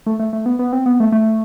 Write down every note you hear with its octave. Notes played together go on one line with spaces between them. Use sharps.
A3
A3
A3
B3
B3
C4
B3
A3
A3